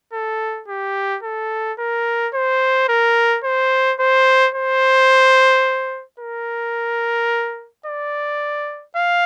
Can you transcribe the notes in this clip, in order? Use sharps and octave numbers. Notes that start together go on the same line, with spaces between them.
A4
G4
A4
A#4
C5
A#4
C5
C5
C5
A#4
D5
F5